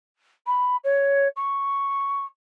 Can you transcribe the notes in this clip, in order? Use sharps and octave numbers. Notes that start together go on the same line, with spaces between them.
B5
C#5
C#6